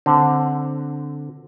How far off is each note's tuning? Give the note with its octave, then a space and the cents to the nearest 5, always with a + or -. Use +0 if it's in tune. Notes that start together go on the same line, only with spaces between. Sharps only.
D3 +0 C4 +0